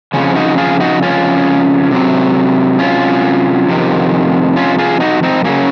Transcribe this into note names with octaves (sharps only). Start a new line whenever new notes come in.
F2 C#3 F3 C#4
D#4 F#4
F4 G#4
D#4 F#4
C#4 F4
C3 F#3 C4
C#4 F4
F2 C3 D#3
C#4 F4
F4 G#4
D#4 F#4
C4 D#4
C#3 F#3 A#3 C#4